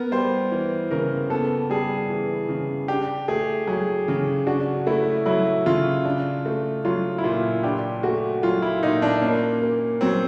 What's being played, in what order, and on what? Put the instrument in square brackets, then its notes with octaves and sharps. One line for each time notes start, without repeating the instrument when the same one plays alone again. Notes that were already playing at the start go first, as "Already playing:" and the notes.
Already playing: [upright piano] B3 [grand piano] A#4
[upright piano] G3 [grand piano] C5
[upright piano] E3
[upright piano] C#3 [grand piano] A#4
[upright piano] B3 [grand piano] A4
[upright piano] G3 [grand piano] G#4
[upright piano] E3
C#3
[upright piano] D4 [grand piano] G4
[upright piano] A3 [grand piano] G#4
[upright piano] F#3 [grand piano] G#4
[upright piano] C#3
[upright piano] D4 [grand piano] F#4
[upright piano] A3 [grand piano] E4
[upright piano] F#3 [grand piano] E4
[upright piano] C#3 [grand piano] F4
[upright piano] D4
A3
[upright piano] F#3 [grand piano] F4
[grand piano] E4
[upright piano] A#2 [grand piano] F4
[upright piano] D4 [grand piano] G4
[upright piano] A3 [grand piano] F#4
[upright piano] F#3 [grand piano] F4
[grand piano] E4
[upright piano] A#2 [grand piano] D#4
[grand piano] D4
[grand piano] A#3 [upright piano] C#4
[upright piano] A#3
[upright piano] F#3 [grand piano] C4